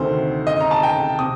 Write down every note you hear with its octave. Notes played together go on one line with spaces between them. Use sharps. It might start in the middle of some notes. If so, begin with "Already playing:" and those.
Already playing: D2 C3 D#3 A3 C5
D#5
A#5
A5
G5
C3 D#6